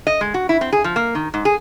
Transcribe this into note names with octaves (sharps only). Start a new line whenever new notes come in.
D#5
G#3
F#4
E4
C4
G#4
F3
A#3
D#3
G#2
G#4